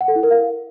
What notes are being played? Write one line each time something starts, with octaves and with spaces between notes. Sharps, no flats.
F#5
A4
E4
A#4
F5